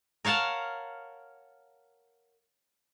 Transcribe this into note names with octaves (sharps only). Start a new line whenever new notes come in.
A#4 C#5 F5 F#5 A5